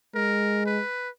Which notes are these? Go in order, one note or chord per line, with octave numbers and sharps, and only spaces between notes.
G#3 A#4
B4